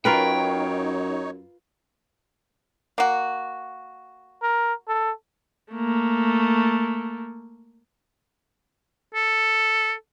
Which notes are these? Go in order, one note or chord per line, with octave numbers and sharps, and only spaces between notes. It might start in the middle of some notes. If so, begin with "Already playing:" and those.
F#2 D#4 F4 A#4 B4 C#5 G5
A#3 F#4
A#4
A4
A3 A#3
A4